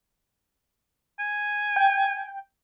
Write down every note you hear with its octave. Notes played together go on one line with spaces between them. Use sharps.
G#5
G5